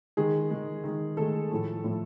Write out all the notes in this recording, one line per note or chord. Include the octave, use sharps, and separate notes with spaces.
D#3 G#3 G#4
D#3 G#3
D#3 G#3
D#3 G#3 A3 A4
A2 F3 A3
A2 F3 A3